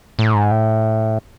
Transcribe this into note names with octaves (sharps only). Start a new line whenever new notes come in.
A2
G#2
A2